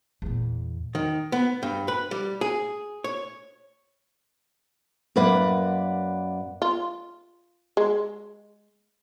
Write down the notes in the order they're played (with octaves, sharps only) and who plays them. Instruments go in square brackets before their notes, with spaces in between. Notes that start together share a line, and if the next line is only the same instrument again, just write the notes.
[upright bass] E2 A#2
[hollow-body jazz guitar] D#3
B3
G2
B4
G3
G#4
C#5
[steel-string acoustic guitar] F#2 A#3 B4 D5 F#5
[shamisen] F4
G#3